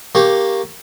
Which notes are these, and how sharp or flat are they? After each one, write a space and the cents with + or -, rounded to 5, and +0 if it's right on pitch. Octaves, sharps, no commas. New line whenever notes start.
A#3 +0 G4 +0 C#6 -10